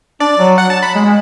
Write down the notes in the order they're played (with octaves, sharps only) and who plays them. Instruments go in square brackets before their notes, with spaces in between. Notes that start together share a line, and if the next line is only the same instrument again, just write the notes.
[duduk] D4 [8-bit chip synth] D5
[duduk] F#3
[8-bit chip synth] F#5
A5
B5
[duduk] G#3
G#3